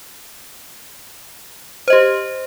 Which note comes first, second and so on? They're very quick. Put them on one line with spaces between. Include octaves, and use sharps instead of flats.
C5 D#5 G4